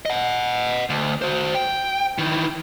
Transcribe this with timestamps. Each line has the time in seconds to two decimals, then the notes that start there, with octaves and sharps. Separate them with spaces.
0.05 D#5 F#5
0.90 D2
1.22 F#4 C5
1.55 G5
2.18 D#3 E3